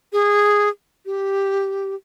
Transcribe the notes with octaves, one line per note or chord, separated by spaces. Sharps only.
G#4
G4